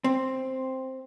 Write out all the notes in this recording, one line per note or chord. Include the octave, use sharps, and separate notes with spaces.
C4